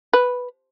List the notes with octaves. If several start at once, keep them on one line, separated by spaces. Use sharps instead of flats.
B4